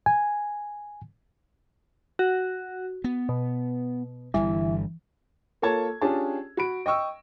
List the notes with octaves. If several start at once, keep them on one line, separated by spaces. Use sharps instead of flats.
G#5
F#4
B3
B2
G1 G2 E3 G3
A#3 F4 A4 C#5 A5 G#6
C#4 D4 F4 G4 G#4 A5
F#4 B5 D7
D#5 G5 C#6 E6